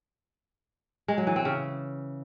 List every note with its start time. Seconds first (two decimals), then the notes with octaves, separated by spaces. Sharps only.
1.08 G#3
1.18 F#3
1.27 E3
1.36 C4
1.45 C#3